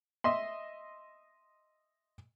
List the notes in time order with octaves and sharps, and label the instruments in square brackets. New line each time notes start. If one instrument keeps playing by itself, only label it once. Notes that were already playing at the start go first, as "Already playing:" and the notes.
[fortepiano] D#5 E5 C6